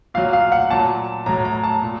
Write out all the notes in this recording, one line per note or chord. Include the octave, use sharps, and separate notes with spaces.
A#2 F#3 F5
F5
F#5
A#2 F#3 A5
A2 F#3 A#5
A#5
A5
A#2